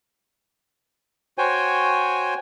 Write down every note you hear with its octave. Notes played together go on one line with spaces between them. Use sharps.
F#4 C5 C#5 G5 G#5